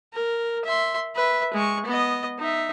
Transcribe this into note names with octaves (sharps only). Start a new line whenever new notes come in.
A#4
E5 C6
B4 E5
G#3 C#6
B3 D#5
D#4 E5